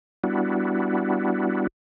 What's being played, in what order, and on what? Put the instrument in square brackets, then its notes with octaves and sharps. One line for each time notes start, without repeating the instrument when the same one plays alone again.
[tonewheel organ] G3 B3 D4 E4 F#4